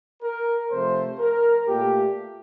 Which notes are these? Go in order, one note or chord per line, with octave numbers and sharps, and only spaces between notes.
A#4
C3 F3 A3 C5
A#4
A#2 A3 G4